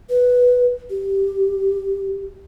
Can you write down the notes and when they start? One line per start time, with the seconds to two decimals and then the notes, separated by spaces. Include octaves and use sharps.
0.10 B4
0.90 G4